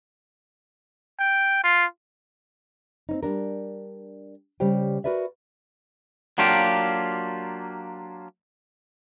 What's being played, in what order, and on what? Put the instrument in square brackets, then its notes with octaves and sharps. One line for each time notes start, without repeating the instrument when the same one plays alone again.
[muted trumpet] G5
F4
[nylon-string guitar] C4 C#4 D#4
G3 D4 A#4
C#3 G3 G4 C5 G5
F#4 A#4 B4 D5 E5
[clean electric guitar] F#3 A#3 D4 F4 G4